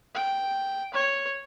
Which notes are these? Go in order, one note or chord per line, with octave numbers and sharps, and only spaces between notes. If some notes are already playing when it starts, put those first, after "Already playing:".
G5
C#5